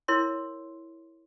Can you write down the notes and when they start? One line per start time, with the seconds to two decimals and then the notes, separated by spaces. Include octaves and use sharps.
0.08 E4 A#4 C#5 C6